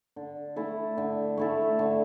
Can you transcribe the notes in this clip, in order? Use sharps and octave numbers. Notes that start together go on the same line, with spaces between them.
D3
A3 E4 A4
D3
A3 E4 A4
D3